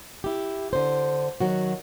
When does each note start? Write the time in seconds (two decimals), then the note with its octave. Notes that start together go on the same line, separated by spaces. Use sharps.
0.24 E4 G4
0.73 D3 C5
1.40 D#3 F#3 F#4